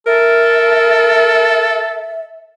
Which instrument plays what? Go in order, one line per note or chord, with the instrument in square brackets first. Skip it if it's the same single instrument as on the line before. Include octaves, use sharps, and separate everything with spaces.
[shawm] A4 [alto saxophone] A#4 [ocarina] E5